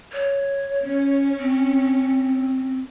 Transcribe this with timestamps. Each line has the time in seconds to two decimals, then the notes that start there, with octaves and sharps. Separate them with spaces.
0.13 C#5
0.83 C#4
1.38 C4